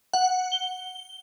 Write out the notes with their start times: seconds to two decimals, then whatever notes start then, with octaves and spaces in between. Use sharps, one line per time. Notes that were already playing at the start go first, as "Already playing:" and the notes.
0.13 F#5
0.52 G7